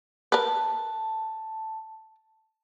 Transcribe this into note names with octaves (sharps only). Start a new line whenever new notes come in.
A#4 B4 A5